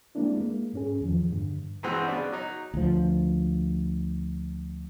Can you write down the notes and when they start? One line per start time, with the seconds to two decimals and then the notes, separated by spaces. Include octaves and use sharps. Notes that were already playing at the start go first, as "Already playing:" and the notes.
0.15 G3 G#3 A#3 C4 D4 E4
0.36 G#3 A#3
0.74 G#2 C#4 G#4
1.01 E2 D#3 F3
1.32 G2 D3
1.83 G2 B2 E3 G#3 C4 F#4
2.08 C#3 B3 D4
2.32 F#3 D#4
2.74 D2 F3